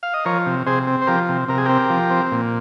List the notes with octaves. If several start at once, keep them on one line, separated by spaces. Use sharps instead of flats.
F5
D#5
F3 A#4 C#5
C3
C3 G#4 C5
C4
C5
F3 G4 A#4
C3
C3 A#4
G#4
C4 G4 A#4
F3
C4
A#2